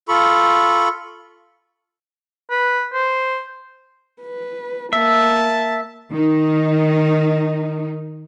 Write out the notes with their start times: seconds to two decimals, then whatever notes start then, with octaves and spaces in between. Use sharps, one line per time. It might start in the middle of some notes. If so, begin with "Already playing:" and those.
0.09 F4 A4 B5 C#6
2.50 B4
2.93 C5
4.22 B4
4.93 A#3 E5 A5
6.12 D#3 D#4